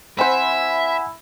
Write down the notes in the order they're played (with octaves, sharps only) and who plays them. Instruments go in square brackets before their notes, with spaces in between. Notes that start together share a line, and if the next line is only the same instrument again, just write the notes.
[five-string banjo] C4 C5 [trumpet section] E4 [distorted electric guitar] E5 [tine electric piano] F#5 G#5 B5